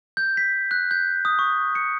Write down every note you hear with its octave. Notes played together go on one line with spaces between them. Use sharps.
G6
B6
F#6
G6
D#6
C#6
C#7